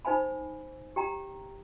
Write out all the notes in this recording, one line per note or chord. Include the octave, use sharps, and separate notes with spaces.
D#4 C5 F5 G#5 B5
G4 G5 A#5